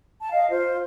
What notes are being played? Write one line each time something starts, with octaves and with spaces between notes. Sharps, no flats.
A5
D#5 F5
F4 C5